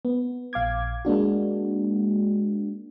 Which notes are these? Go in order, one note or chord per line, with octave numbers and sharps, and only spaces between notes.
B3
A#1 F5 D6 G#6
G#3 A#3 D4 F#4